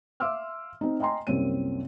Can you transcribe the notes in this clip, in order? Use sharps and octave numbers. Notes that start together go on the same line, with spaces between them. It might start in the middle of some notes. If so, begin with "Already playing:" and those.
E5 F5 C6 D6 E6 F6
C4 D#4
D#5 G5 G#5 A#5 C6
C2 F#2 A#3 C4 C#5 D#7